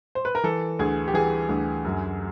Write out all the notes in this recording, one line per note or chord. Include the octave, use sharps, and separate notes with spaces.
C5
B4
A#4
E3 A4
D2 G#4
G4
E3 G#4
D2
F#2